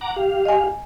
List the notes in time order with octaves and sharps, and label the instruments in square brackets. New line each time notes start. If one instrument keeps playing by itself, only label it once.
[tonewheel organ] F#5 A#5 D6
G4 F5
[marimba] D#5 G#5